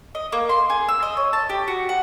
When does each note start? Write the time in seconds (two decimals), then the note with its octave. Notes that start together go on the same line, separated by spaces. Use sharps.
0.15 D#5
0.32 A#3
0.49 C6
0.70 G#4
0.89 E6
1.02 D#5
1.17 C#5
1.33 A5
1.49 G4
1.68 F#4
1.89 F#5